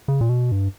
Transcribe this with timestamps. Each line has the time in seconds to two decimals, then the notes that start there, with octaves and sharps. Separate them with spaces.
0.08 C#3
0.21 A#2
0.29 B2
0.52 G2